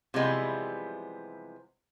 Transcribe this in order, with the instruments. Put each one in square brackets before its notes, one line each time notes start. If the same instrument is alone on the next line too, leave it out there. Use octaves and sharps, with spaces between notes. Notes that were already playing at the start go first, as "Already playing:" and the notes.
[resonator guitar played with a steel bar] C3 E3 F3 G3 G#3 B3